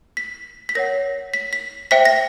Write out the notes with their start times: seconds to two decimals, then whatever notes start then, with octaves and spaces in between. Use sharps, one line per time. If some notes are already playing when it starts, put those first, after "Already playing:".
0.17 B6
0.69 B6
0.75 A#4 C#5 F#5 A#6
1.34 B6
1.53 B6
1.91 C5 E5 G5 B6
2.05 A#6